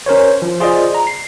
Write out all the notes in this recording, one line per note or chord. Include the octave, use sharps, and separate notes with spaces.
C#4 A#4 C5 C#5
F3
F4 G#4 C5 D5 D#5
A#5
C7